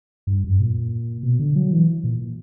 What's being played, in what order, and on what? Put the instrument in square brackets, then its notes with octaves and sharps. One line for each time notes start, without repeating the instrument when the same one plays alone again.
[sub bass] G2
F#2
A#2
B2
D3
F#3
E3
A#2